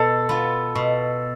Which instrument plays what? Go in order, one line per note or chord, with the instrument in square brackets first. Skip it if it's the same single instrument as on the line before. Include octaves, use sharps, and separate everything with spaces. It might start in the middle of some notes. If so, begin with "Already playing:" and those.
Already playing: [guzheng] B2 [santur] A4
[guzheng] B3 F4
B2